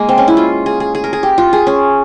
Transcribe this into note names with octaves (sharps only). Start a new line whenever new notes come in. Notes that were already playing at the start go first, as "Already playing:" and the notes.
Already playing: G#3 A#3
C4
C#4
E4
F4
G#4
G#4
G#4
A#4
G#4
G4
F4
G#4
C#4